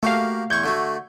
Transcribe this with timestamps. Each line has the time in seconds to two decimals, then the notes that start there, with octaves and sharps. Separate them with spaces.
0.03 A3 A#3 F#4 G4 F5
0.50 E2 C#6 G6 G#6
0.64 D3 A3 F#4